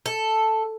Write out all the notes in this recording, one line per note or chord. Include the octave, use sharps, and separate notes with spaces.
A4